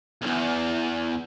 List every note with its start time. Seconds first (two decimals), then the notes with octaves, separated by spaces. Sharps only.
0.22 B1 E2